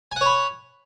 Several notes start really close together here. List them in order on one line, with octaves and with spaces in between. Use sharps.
G#5 F#5 C#5 B5